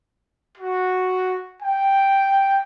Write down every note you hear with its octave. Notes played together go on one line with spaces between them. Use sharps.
F#4
G5